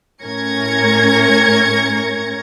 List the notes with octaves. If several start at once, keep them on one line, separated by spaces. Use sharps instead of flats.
A2 C#4 A#4 G#6 A#6 C#7